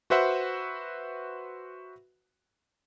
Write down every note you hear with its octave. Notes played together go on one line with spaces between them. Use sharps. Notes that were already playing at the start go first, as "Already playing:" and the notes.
F#4 B4 C5 E5 F#5